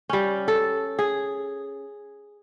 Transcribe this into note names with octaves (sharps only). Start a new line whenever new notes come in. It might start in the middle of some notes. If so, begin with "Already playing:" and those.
G3 C#4
A4
G#4